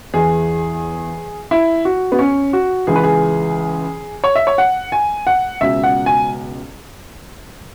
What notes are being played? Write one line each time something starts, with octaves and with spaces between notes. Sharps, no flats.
E2 E3 G#4
E4
F#4
B3
C#4
F#4
C#2 C#3 E3 G#4
B4
G#4
C#5
E5
C#5
F#5
G#5
F#5
C#2 B2 E5
F#5
G#5